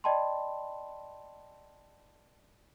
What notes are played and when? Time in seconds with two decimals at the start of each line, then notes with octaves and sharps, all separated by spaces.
0.04 D5 D#5 G5 A5 B5 C6